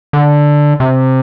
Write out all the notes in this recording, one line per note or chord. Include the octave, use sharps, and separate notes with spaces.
D3
C3